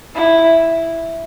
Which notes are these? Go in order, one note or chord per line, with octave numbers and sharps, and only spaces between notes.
E4